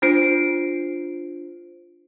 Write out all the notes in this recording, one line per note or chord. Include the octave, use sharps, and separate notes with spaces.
D4 F4 C5 C7 D7